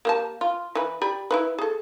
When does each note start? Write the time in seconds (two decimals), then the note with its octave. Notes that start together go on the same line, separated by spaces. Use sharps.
0.05 A#3 G4 A5
0.41 F4
0.75 E3 B4
1.02 G4 D5 B5
1.31 E4 F4 B4
1.58 G#4 A4